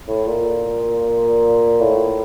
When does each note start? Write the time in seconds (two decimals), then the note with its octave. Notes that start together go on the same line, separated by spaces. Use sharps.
0.08 A2
0.27 A#2
1.80 A2